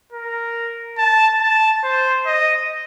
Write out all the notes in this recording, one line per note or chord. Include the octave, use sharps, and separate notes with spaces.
A#4
A5
A5
C5
D#5